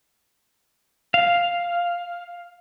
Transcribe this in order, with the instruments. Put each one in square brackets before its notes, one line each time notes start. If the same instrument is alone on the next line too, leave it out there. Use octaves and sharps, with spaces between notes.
[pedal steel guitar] F5